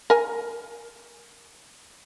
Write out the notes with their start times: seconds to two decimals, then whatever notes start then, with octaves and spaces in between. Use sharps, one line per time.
0.10 A#4 G#5